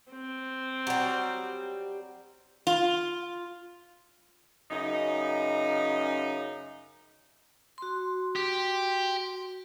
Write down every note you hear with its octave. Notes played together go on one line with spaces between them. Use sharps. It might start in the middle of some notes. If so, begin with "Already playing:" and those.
C4
F#3 G3
F4
F#2 C#3 D#4
F#4 C6
G4